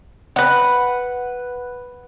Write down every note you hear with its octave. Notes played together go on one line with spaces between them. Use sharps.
B4 F#5